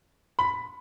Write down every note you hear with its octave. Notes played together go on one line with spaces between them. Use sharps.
B5